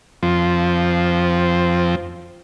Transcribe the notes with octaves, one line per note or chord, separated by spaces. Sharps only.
F2 F3 C4